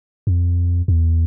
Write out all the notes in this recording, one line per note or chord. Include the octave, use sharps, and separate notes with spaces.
F2
E2